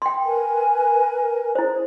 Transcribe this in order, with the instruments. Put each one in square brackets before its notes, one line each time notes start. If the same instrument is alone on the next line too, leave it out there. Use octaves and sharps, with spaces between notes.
[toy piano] G5 C6
[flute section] A#4 B4 G#5
[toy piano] E4 C5 [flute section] G#4